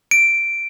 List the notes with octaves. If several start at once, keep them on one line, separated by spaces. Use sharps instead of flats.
D7